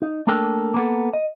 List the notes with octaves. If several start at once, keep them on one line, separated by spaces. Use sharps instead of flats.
D#4
A3 A#3 D4 A4 A#4 G5
A#3 B3 A4
D#5